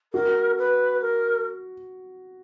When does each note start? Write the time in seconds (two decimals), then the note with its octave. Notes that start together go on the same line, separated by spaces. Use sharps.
0.13 F#4 A#4
0.57 B4
1.01 A#4